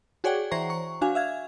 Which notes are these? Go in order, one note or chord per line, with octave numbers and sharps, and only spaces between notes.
F#4 G#4 C#5 D5 F#5 G5
E3 C5 A#5 C#6
C#6
D4 F#4 F5 G#5
E5 F5 G#6